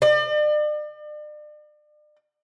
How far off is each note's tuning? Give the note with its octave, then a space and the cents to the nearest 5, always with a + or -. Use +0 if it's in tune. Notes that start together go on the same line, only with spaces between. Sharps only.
D5 +40